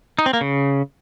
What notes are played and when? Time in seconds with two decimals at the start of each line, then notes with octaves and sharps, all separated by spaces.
0.19 D#4
0.26 C4
0.33 A#3
0.41 C#3